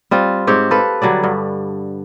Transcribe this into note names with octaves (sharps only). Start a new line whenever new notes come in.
G3 C4 F4
G#2 C4 G4 C#5
A4 B4 F5
D3 F#3 G3 D5
G2